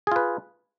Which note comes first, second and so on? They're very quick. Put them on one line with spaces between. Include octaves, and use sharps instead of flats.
G#4 F4 B4